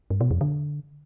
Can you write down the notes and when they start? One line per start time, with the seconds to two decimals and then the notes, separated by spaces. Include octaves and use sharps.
0.10 G2
0.21 B2
0.31 F2
0.41 D3